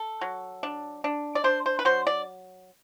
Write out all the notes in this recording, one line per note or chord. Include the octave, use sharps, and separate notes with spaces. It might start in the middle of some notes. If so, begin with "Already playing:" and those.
Already playing: A4
F#3
D4
D4
D5
D4 C5
C5
B4
F#3 C5
D5